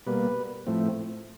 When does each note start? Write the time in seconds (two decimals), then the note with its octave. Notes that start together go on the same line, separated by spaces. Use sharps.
0.06 B2 G3 A#3 B4
0.67 A2 F3 A3 C4